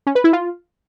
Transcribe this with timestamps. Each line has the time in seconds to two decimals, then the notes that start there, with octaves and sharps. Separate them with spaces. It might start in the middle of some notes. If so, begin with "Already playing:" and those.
0.07 C#4
0.15 B4
0.24 E4
0.33 F4